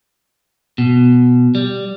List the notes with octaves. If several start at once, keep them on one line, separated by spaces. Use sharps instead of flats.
B2
G3